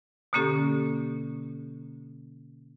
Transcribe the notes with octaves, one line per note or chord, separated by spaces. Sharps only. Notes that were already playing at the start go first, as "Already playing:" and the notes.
B2 D3 A#3 C#4 G4 A4